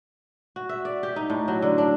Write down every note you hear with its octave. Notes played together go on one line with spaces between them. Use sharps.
F#4
E5
D5
G4
D#4
A2
F#3
D3
D4